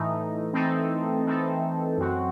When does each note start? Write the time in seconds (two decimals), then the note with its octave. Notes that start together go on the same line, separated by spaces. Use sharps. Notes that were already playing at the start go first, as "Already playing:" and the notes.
Already playing: A2 E3 A3 D#4
0.53 E3 A3 C4 D#4 A4
1.25 E3 A3 C4 D#4 A4
1.98 F#2 F#3 C4 F#4